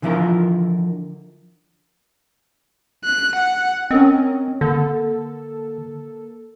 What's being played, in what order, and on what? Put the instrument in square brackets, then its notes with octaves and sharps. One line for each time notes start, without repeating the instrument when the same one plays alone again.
[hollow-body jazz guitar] D3 E3 F3 E4 F4 A#4
[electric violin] F#6
F#5
[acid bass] C4 [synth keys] C#4 A#4 D#5
[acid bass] D3 [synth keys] A#3 A4